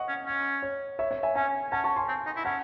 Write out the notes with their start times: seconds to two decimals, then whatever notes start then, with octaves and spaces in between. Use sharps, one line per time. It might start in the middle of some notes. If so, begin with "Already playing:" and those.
Already playing: D#5 F#5 C#6
0.08 C#4
0.27 C#4
0.62 C#5
0.99 C#5 E5
1.11 C#5 E5
1.23 E5 G#5
1.36 C#4 E5 G#5
1.71 C#4 F#5 A5
1.84 A5 C#6
1.96 G#5 C6
2.08 C4
2.26 D#4
2.36 E4
2.45 C#4 F#5 A5